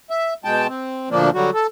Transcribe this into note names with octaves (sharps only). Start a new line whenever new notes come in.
E5
B2 G#3 G5 A5
C4
D2 A#2 F3 A#3 D4
D3 F#3 G3 F#4
A4